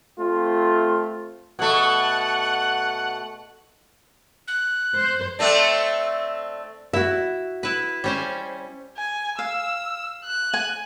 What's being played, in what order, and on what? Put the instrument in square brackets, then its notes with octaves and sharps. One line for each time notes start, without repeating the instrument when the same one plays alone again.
[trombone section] A3 C4 F4
[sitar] B2 A3 [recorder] F#5
[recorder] F#6
[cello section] C5
[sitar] A3 C4 D4
[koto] E4 [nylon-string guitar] F#4 E5
[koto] E4 B4
G3 C#4 C5
[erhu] G#5
[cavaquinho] F5 [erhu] E6
[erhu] F#6
[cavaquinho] G#5